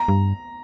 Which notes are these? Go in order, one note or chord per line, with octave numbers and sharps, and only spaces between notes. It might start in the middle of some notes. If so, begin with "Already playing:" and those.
Already playing: A#5
G2